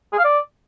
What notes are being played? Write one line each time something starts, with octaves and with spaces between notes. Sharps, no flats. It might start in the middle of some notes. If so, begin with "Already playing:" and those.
G#4
F5
D5